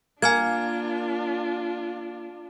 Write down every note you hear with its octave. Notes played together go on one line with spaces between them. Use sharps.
A#3 D4 F4 G#5 F6 G#6